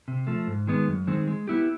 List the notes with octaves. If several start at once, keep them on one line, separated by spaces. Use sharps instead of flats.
C3
F3 A3
G#2
D#3 G#3 B3
F#2
D#3 G#3 C4
G#3
B3 E4 G4